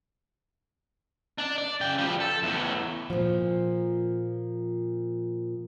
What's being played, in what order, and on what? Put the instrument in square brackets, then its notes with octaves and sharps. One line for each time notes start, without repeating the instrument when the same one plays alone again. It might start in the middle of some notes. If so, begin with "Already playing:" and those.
[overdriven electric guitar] D4 D5
D5
C#3 G5
F3 G3
A4
E2 A2
[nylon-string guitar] A#2 F3